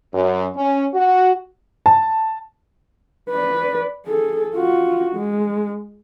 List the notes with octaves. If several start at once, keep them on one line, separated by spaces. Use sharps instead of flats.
F#2
C#4
F#4
A5
B4 D5
G#4 A4
F4 F#4
G#3